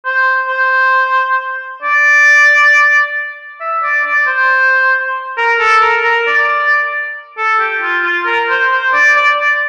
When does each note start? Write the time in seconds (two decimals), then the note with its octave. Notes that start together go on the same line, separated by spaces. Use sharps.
0.05 C5
0.49 C5
1.83 D5
3.60 E5
3.83 D5
4.04 D5
4.27 C5
5.37 A#4
5.59 A4
5.81 A#4
6.04 A#4
6.27 D5
7.38 A4
7.60 G4
7.82 F4
8.04 F4
8.26 A#4
8.49 C5
8.72 C5
8.93 D5
9.16 D5
9.38 D5